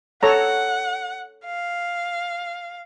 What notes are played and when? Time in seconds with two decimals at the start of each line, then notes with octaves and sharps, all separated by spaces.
0.23 A4 C#5 F#5 A#5
1.45 F5